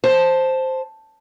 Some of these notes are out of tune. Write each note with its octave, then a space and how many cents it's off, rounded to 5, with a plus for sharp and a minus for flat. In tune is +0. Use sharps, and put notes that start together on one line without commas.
C5 +0 A5 +0